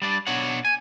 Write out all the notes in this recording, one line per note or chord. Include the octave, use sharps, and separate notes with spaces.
G3 D4 D5
B2 D4 C#5 F#5
G#5